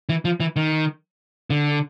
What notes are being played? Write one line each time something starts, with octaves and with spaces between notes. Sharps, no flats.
E3
F3
E3
D#3
D3